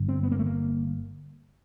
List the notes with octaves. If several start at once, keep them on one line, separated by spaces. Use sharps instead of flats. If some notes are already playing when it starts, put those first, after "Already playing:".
Already playing: G1 G2 D3
C4
B3
A#3
A3
A#3